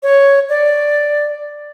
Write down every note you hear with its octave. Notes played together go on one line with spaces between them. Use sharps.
C#5
D5